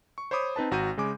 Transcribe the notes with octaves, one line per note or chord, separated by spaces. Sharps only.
C#6
C5 C#5 B5 D6 D#6
C4 D#4 B4 A5
G#1 F#4 A#5 G6 D#7
C#3 G#3 G#5 D6